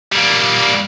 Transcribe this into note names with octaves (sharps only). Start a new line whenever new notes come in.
G3 A#3